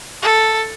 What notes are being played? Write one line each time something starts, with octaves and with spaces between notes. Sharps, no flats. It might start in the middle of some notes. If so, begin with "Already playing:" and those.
A4